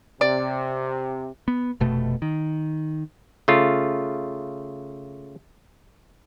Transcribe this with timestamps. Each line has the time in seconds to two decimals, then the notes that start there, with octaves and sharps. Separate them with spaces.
0.21 C3 D5
1.48 B3
1.80 F1 B2 A3
2.22 D#3
3.48 C#3 A3 F4